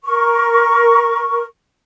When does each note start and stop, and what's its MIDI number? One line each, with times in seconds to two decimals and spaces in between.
0.04 1.44 70
0.04 1.44 85